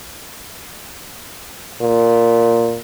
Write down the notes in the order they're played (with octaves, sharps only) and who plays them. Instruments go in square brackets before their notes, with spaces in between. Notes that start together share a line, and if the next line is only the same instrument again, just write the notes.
[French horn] A#2